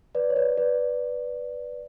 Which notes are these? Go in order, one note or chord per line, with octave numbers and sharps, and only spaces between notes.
B4 D5
C#5
B4 D5
B4 D5